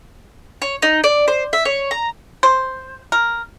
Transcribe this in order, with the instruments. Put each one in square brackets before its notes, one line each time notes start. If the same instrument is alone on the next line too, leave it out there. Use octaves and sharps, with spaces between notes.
[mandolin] C#5
D#4
D5
C5
E5
C#5
A#5
[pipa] C5
A#4